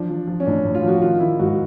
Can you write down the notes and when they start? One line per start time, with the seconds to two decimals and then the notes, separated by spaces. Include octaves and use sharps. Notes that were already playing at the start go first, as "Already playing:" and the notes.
Already playing: F3 D4
0.10 F3
0.27 F3
0.40 C#4
0.46 A2 D4
0.64 A2
0.75 F4
0.83 F3 F#4
1.02 D#3 F4
1.20 D#3 E4
1.39 G#2 F#4